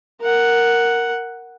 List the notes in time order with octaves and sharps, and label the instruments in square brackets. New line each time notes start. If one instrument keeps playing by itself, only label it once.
[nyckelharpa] A#4 F#5